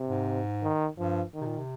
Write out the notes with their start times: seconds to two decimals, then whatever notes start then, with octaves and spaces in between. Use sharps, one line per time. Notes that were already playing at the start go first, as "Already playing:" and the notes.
Already playing: C3
0.08 G#2
0.63 D#3
0.98 G2 F3
1.34 D#3
1.41 C3
1.47 A#2
1.58 C3